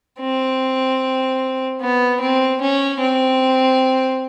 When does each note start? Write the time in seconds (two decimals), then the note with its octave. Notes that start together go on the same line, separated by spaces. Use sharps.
0.20 C4
1.81 B3
2.21 C4
2.61 C#4
3.00 C4